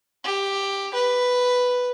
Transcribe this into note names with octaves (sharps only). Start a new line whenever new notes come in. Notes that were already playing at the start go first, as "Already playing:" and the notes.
G4
B4